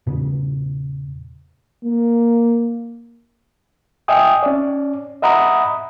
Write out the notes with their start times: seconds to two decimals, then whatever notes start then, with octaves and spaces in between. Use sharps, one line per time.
0.07 E2 A#2 C#3 B3
1.84 A#3
4.08 D#5 E5 G5 G#5 D#6
4.43 C#4 D5
5.22 D#5 E5 F#5 A#5 B5 D#6